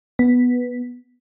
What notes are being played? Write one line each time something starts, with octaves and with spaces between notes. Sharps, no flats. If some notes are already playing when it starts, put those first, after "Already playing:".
B3